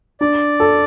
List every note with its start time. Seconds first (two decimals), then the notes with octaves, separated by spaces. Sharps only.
0.21 D4 D5
0.60 A4